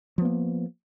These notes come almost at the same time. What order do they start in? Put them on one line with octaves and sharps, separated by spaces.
F3 B3 A#3